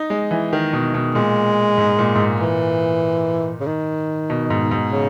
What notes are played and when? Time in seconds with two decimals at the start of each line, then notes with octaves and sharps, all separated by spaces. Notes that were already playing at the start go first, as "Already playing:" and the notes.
Already playing: D#4
0.10 G#3
0.31 E3
0.53 D#3
0.73 B2
0.94 B2
1.15 A#2 G#3
1.78 G#2
1.99 A#2
2.15 G#2
2.20 A#2
2.40 E3
3.60 C#3
3.67 D#3
4.30 B2
4.50 G#2
4.71 G#2
4.92 C#3